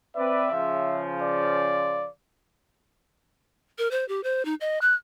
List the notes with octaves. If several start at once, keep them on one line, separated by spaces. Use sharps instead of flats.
C4 B4 D5 E5
C#3 F3
D5
A#4
C5
G4
C5
D#4
D#5
F#6